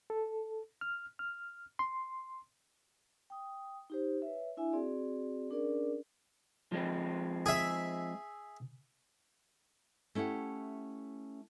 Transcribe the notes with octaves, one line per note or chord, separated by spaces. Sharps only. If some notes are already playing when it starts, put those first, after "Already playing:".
A4
F6
F6
C6
G5 D#6
D#4 G4 C5
B4 C#5 E5
D4 E4 E5 G#5
C4 F#4 G#4 D5
C#4 D4 G#4 A#4 D5
F3 G#3 C4
G#4 E5
A3 C#4 E4 G4 F#5